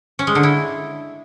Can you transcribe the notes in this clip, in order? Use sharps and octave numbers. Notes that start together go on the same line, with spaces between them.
C#4
G#3
D3
E4